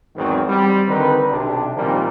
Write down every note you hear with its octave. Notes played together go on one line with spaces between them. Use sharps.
E2 G#2 D#3 F#3 B3 C4
G3 C4
D3 D#3 C4 D#4 B4
B1 C3 D4
A#2 D#3 F3 G3 A#3 C4